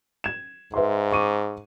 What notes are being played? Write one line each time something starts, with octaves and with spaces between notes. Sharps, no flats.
G#6 E7
G#2 B4 E5 C6
C#6 D6 D#7